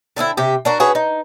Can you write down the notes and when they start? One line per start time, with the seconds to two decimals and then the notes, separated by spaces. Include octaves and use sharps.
0.16 D3 C4 D#4 E4
0.37 C3 G4
0.65 D4 F#4 A#4
0.80 C#4 F#4 G#4 B4
0.95 D#4